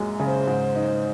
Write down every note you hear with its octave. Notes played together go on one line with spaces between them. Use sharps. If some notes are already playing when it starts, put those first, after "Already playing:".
Already playing: F#2 A#2 G#3
C#3
C5
G#2
D#4